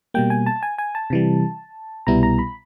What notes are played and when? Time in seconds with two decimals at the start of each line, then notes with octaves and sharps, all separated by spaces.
0.14 B2 G3 A#3 G5
0.30 G#5
0.46 A5
0.63 G#5
0.78 G#5
0.95 A5
1.10 C3 E3 G3
2.07 C2 B2 G3 B3 E4 A#5
2.23 A#5
2.39 B5